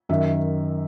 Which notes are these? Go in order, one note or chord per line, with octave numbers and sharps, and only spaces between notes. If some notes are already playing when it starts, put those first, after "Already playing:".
F#2 D#3 E5